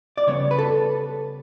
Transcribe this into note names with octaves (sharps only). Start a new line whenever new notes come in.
D5
C#3 G3 B3 C#5
B4
A4